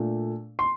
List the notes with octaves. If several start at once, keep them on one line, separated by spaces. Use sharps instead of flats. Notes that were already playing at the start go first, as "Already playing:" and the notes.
Already playing: A#2 A3 D4
C6